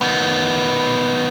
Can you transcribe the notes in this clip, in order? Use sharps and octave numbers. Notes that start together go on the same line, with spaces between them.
D#3 B3